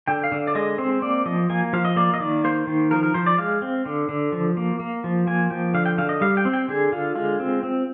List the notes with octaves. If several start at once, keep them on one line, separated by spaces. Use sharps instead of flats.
D3 G5
F5
D3
D5
G#3 D#5
C4 C5
A#3 D5
F3 D#5
A#3 G#5
F3 F5
D#5
A#3 D5
D#5
D#3 D5
A#3 C5
D#3
F3 A#4
A#4
F3 C5
D5
G#3 F5
C4
D3
D3
F3
A#3
A#3
F3
A#3 G#5
F3 G5
D3 F5
G5
D3 F5
D#5
G3 F5
G5
C4
G5
D3 G#4
D3 F4
G#3 F4
C4
C4